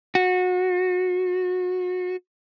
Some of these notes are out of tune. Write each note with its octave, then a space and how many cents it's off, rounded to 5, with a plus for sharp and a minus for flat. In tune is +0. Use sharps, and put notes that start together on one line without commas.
F#4 -25